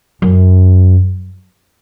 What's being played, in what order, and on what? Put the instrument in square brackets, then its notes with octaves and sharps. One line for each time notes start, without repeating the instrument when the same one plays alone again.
[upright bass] F#2